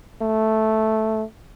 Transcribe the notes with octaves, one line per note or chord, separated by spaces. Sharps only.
A3